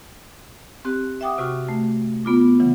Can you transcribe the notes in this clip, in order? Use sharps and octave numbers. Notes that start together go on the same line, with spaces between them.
C4 G4 F#6
E5 F#5 G5 D6 D#6
C3 F#4 C#6 E6 F6
A3
B3 F4 D6
C#3 E3 F#3